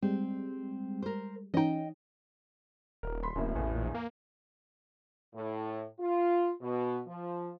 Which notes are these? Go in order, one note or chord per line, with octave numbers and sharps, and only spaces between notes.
G3 G#3 C4
A#4 C5
E3 C#4 D#4 D#5 G5
D#1 A#4
B5 C6 B6
D1 F#2 A2 A#3
A1 E2 A2
A#1
A#3
A2
F4
B2
F3